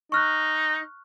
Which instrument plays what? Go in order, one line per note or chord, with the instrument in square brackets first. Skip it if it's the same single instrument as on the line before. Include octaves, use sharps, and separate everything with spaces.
[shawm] D#4 [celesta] C#6 F6 F#6